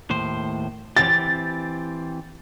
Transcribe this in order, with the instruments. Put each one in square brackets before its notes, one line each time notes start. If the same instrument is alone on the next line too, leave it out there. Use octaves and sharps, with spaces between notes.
[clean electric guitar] D#2 A2 C5
[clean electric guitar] E3 C4 G4 [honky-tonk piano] A6